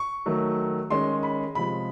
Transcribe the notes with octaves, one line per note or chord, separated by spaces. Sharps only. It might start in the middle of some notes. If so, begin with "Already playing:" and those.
Already playing: C#6
D#3 F#3 A3
D#3 G#3 C#4 C6
B5
C3 F3 G#3 B5